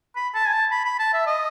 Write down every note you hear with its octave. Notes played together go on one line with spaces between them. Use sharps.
B5
A5
G#5
A5
B5
B5
A5
E5
D#5